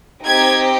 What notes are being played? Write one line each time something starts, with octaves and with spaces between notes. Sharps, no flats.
C4 D#4 G4 G#6